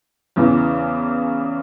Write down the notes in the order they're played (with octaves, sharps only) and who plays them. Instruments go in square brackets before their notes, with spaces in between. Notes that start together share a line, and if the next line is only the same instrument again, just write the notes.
[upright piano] E2 C#3 E3